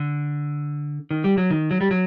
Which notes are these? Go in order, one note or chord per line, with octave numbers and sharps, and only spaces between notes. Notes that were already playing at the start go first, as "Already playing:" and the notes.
Already playing: D3
D#3
G3
F#3
D#3
F#3
G3
F#3